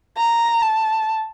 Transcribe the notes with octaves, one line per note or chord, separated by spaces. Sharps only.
A#5
A5